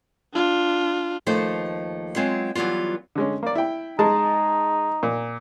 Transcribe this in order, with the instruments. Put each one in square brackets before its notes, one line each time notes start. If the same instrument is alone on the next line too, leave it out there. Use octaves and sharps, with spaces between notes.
[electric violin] D4 F4
[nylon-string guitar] D#2 F3 A3 D#4 C5
F#3 G#3 B3 C4 F4
E3 F#3 G3 B3 F4
[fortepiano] D3 G#3 C#4
A#3 D5
E4 G5
[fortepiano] G#3 G#4 A5 [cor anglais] D#4
[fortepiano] A#2